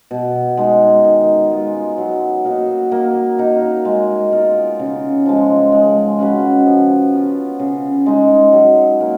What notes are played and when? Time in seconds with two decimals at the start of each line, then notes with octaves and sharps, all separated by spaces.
0.11 B2
0.57 G#3 D#4
1.04 D#3
1.51 G#3 B3 F4
1.98 F#3
2.44 A#3 D#4 F#4
2.92 A#3
3.38 D#4 A#4
3.85 G#3
4.32 B3 F4 A#4
4.79 C#3
5.26 F3 G#3
5.72 G#3
6.19 C#4 F#4 B4
6.66 F3
7.13 B3 F4 A#4
7.59 C#3
8.06 G#3 D#4
8.53 F#3
9.00 A#3